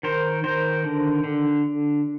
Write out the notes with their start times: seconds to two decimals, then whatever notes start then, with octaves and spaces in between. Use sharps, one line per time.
0.03 D#3 A#4 C5
0.44 D#3 A#4 C5
0.84 D3
1.24 D3